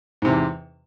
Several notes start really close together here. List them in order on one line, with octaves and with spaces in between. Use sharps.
G#2 C3 E2